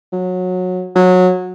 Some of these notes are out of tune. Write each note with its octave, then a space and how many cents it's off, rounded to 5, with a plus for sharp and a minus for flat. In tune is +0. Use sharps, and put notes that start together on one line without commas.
F#3 -20
F#3 -20